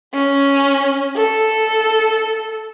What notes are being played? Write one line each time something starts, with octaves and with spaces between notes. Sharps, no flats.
C#4
A4